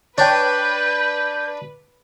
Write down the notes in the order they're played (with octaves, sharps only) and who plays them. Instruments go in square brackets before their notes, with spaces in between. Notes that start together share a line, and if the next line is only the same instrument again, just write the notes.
[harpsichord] D4 [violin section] B4 [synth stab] C#5 G5 [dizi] G6